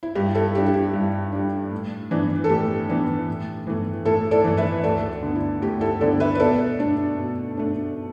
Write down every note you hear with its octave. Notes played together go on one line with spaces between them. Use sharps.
E4
G2 G4
E4 A4
G3 D4 G4
G4
E4
G2
G3 D4
A2
E3 B3 D4
A4
A2 G4
E3 B3 D4
A2
E3 A3
A2 E4 A4
A4 D5
E3 A3
B4 E5
D2 A4 D5
D3 B3
E4
D2 G4
E4 A4
D3 B3 A4 D5
B4 E5
B4
B2 A4 D5
A3 D4
B2
A3 D4